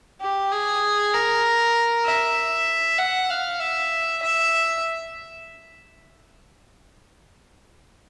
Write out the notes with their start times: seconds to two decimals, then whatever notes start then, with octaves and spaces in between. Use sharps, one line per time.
0.21 G4
0.52 G#4
1.13 A#4
2.05 E5
2.98 F#5
3.30 F5
3.60 E5
4.22 E5